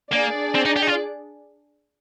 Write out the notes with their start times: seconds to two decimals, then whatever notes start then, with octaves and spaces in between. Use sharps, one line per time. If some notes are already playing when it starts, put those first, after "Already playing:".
0.13 A#3 D4 G#4 D5
0.55 C4
0.65 D#4
0.76 G4
0.82 D#4
0.87 F4